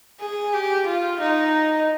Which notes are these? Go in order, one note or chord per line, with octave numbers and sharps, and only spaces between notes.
G#4
G4
F4
D#4